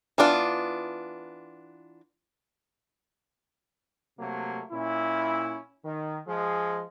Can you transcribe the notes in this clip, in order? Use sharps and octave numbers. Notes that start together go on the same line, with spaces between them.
E3 B3 D4 F4
C3 F#3 A3 A#3
A#2 C#4 E4
D#3
F3 G#3 G#4